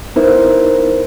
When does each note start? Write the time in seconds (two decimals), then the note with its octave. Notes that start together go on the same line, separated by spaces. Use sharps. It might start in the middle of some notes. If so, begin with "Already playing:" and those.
0.16 B3 D#4 E4 A#4 C5